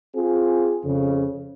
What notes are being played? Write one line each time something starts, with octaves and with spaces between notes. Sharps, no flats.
C4 F4 G#4
F2 C#3